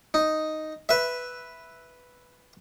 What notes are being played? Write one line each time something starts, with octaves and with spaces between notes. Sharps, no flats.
D#4
B4 E5